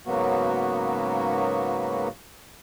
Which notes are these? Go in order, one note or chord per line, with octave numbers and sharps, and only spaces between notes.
G#2 C#3 F#3 A#3 B3 F#4